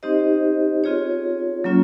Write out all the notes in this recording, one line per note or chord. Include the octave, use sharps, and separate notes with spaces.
C4 D#4 G4 C5 D#5
C4 F4 G#4 C#5
F#3 A#3 C#4 F4